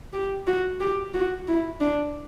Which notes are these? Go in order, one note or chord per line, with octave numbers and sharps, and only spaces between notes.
G4
F#4
G4
F#4
E4
D4